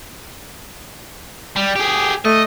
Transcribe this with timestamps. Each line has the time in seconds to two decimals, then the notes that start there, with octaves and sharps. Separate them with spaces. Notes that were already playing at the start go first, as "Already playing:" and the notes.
1.56 G3
1.76 G4 G#4
2.25 A3 D#5